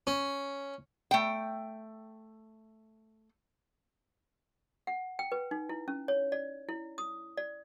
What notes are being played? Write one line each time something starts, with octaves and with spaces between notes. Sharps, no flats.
C#4
A3 G5
F#5
G5
B4
D#4
E4
C#4
C#5
D5
E4
D#6
D5